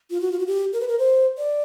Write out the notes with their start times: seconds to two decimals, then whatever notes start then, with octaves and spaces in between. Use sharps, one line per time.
0.10 F4
0.21 F#4
0.32 F4
0.39 F#4
0.47 G4
0.73 A#4
0.80 B4
0.88 A#4
0.99 C5
1.38 D5